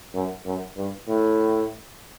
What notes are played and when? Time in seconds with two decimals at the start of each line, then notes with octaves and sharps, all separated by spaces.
0.14 F#2
0.45 F#2
0.76 G2
1.08 A2